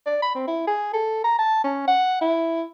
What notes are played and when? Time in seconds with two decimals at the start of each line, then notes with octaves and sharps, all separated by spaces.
0.06 D5
0.22 B5
0.35 C4
0.47 E4
0.67 G#4
0.93 A4
1.24 A#5
1.38 A5
1.64 C#4
1.87 F#5
2.21 E4